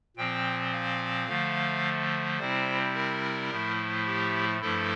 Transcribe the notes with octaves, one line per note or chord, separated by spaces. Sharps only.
A#2 F3 C4 G5
F5
D3 F3 A3
C3 G3 C4 E4 C5
A#4
A2 F3 A3 E4
G4
G2 F3 A3 E4 A4